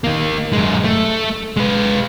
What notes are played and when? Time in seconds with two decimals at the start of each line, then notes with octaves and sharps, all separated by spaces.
0.04 D#3 A#3
0.53 F#2 G#3
0.85 A3
1.57 G#3 B4